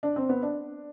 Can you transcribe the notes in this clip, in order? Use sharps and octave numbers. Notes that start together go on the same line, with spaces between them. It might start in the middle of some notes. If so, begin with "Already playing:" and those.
D4
C4
B3
D4